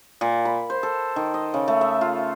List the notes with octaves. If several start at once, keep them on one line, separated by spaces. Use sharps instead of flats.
A#2
B5
C5
A4
D#3
D#5
C#3
A3
E5
F4